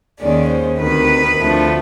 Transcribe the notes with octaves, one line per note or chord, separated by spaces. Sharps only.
D#2 D#3 G#3 C#4 D5
C5
D2 C3 D#3 B4
D2 D3 F3 A3